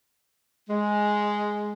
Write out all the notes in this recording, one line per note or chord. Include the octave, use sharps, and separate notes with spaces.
G#3